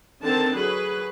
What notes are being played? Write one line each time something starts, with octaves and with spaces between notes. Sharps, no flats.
D3 D#3 C4 A5
F#3 G#4 B4